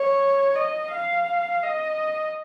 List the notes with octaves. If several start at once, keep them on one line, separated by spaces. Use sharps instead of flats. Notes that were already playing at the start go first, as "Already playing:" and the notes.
Already playing: C#5
D#5
F5
D#5